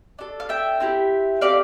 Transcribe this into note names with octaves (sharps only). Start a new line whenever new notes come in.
D4 A4
F5
E5 G5
C4 E4 G4
A3 C4 G4 D5 F5